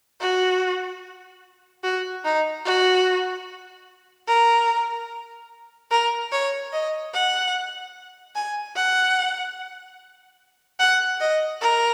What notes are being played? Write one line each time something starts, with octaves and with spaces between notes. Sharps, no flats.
F#4
F#4
D#4
F#4
A#4
A#4
C#5
D#5
F#5
G#5
F#5
F#5
D#5
A#4